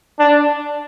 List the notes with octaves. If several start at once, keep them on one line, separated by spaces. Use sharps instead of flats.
D4